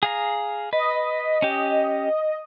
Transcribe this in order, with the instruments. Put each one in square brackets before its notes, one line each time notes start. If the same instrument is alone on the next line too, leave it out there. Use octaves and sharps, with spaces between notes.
[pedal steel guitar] G#4 F5 A#5
[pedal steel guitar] B4 [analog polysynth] D#5
[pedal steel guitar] C#4 G4